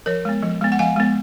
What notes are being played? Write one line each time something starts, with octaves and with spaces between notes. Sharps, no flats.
F3 A#4 C#5
G#3 B3
F3
G#3 B3
F#5
F3 F5 G#5
G#3 B3